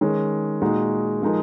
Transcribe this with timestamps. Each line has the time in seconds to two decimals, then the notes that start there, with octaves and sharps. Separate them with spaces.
0.01 D#3 G#3 C#4 G#4
0.62 A#2 G#3 D#4 F#4
1.22 F3 G#3 D#4 A#4